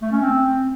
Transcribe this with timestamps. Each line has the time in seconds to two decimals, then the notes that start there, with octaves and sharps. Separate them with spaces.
0.02 A3
0.12 C#4
0.21 C4